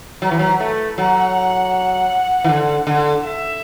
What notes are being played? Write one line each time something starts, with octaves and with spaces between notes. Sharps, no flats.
F#3 B4
E3
F#3
A3
F#3 F#5
E3
D3
D3
E5